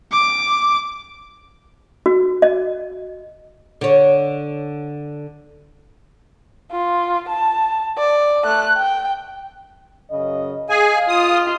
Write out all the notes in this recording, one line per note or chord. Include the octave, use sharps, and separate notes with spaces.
D6
F#4
D#5
D3 C#5
F4
A5
D5
A3 F#6
G5
F#2 C#3 D#5
G#4 D#5 F5 G#5
F4 D#6